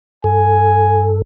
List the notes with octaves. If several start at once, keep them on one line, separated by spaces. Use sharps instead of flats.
G2 A4 G#5